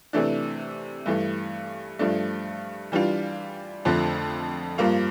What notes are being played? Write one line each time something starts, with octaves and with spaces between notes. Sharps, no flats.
C3 E3 A3 D4
G2 E3 A3
G2 F3 A3 D4
E3 G3 D4 F4
F2 D3 F3 A3
G2 F3 A#3 F4